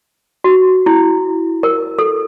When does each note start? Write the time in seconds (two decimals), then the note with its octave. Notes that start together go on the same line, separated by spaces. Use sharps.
0.44 F#4
0.86 E4
1.63 A#4
1.99 A4